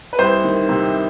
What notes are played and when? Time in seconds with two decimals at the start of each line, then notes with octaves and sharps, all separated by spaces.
0.13 B4
0.19 C2 C5
0.44 D#3
0.69 C3